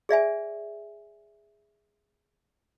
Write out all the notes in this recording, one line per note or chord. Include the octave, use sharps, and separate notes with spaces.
G#4 D5 E5 G#5